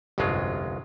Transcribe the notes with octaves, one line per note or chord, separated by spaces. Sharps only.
G1 C2 F2 F#3 G#3 F4